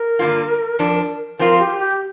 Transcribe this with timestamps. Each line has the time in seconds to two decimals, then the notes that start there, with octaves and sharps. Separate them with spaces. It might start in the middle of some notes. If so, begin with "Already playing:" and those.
Already playing: A#4
0.19 G2 D3 A#3 F4
0.79 F2 F3 D4
1.39 F3 C4 F4 A#4
1.59 G4
1.79 G4